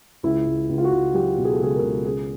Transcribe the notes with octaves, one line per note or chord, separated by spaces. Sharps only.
C#2 E4
C#2
C#2
F4
F#4
C#2
F#3 G4
B2
G#4
A4
C#2 G#4
A#4
C#2
C#3 G#4